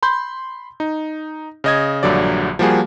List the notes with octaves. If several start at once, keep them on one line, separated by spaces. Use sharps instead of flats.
B5 C6 G6
D#4
C#3 D#5 G#6
A#1 G2 D3 F#3 D5
F3 G3 A#3 F#4 G#4 F5